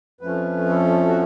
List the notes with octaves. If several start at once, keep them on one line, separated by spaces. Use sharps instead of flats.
F2 F3 A3 C#4 B4
A4
F#4